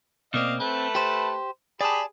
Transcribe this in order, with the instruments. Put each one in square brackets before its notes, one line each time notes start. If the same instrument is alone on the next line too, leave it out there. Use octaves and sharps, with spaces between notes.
[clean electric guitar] B2 A#3 C4 [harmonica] D5 D#5 F5
[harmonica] A3 B4 A5 [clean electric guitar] C4
[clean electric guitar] G4 C5
[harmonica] G4 G#4 B5 [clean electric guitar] D5 A5